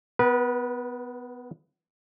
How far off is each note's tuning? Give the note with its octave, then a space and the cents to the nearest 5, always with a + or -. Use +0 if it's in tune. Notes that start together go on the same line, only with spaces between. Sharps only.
B3 +15 B4 -30